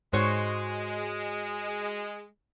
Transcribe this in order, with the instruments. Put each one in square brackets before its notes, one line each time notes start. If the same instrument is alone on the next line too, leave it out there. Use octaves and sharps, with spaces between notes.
[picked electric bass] G#2 [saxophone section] G#3 [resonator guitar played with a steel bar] F#4 C5 C#5